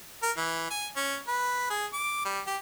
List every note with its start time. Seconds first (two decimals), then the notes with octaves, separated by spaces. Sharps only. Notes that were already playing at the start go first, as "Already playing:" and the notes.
0.22 A#4
0.37 E3
0.70 G#5
0.96 C#4
1.28 B4
1.70 G#4
1.93 D6
2.25 G3
2.47 G4